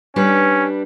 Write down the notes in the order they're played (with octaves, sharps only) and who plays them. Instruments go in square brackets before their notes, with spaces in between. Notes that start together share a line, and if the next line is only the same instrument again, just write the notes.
[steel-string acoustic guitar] G3 D4 B4 [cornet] C#4